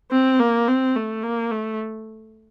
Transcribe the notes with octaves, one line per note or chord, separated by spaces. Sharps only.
C4
A#3
C4
A3
A#3
A3